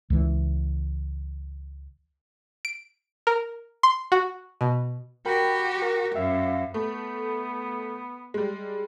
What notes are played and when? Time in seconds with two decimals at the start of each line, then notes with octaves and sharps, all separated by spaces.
0.10 C#2 E3
2.65 D7
3.27 A#4
3.83 C6
4.12 F#4
4.61 B2
5.25 F#4 G4 A#4 G5 B5
5.82 A#4
6.15 F#2 E5 F5
6.74 A3 B3
8.34 G3 G#3